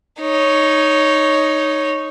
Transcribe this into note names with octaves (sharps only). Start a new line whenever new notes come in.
D#4 C#5